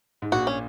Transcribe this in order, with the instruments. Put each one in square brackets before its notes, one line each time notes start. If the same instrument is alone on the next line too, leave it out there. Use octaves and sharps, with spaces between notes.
[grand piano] G#2
[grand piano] A#1 A#2 [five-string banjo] F#4
[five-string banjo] C#4